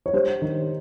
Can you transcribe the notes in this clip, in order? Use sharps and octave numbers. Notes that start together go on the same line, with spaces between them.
C#5
G3 C5
D#3